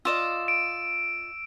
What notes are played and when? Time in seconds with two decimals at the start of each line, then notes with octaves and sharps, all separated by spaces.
0.05 F4 D5 D#5 E6 E7
0.48 D7